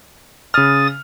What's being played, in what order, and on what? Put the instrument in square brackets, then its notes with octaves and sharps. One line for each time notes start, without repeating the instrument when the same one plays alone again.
[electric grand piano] C#3 F6 [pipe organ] D#6 A6